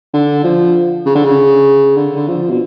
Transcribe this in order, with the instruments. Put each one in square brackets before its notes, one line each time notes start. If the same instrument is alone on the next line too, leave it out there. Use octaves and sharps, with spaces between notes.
[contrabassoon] D3
F3
C#3
D3
C#3
D3
D3
F3
B2